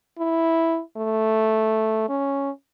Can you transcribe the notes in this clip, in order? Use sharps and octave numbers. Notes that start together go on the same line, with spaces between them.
E4
A3
C#4